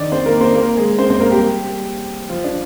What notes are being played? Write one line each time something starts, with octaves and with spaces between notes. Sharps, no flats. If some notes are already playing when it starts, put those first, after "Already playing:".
Already playing: D#3 D4 D#4 D5
C4 C5
A#3 A#4
C4 C5
A#3 A#4
G#3 G#4
C4 C5
C4 C5
A#3 A#4
G3 G4
F3 F4
D4